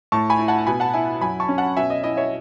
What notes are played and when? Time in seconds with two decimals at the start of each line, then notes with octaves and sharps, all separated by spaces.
0.12 A2 A5 C#6
0.30 G#5 B5
0.39 E4
0.48 F#5 A5
0.58 A5
0.67 B2 G#5 B5
0.80 F#5 A5
0.94 E4 E5 G#5
1.21 F#2 G#5 B5
1.40 A5 C#6
1.48 C#4
1.58 F#5 A5
1.77 B2 E5 G#5
1.90 D#5
2.04 E4 D#5
2.17 C#5 E5